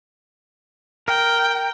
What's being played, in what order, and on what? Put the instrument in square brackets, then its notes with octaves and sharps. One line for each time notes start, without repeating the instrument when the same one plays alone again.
[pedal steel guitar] A#4 [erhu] G5